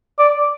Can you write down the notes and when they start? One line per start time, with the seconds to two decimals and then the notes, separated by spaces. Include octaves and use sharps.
0.19 D5